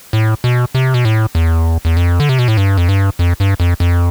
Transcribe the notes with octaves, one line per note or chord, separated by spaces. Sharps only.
A2
B2
C3
B2
A2
E2
E2
F2
D3
C3
B2
A2
G2
F2
G2
F2
G2
F2
F2